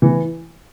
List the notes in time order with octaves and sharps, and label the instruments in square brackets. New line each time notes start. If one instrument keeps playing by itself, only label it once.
[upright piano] E3